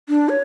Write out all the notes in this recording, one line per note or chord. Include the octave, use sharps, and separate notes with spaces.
D4
C#5